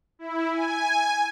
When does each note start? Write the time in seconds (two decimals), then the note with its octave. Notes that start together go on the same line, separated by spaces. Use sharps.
0.19 E4
0.52 G#5